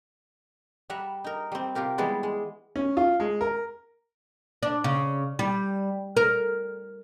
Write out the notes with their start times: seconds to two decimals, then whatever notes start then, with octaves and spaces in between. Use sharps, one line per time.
0.90 G3 E5 F#5 A#5 B5
1.24 D#4 A#4
1.52 G3 C4
1.75 C3 F4 G4 A#4
1.98 E3 G3 G#3 B3 D5 B5
2.23 G#3
2.76 C#4
2.97 F4
3.20 G#3
3.41 A#4
4.63 D4
4.84 C#3
5.39 G3
6.17 A#4